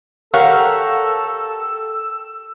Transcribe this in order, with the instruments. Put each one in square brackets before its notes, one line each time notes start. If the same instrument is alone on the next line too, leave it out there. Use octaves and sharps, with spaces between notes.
[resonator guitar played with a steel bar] G4 A#4 C#5 [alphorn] A4 [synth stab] F5 F#5 [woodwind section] E6